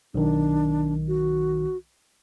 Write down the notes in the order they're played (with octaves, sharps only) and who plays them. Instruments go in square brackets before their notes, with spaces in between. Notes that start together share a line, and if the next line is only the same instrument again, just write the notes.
[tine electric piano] B1 D#3 [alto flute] D4
[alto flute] F#4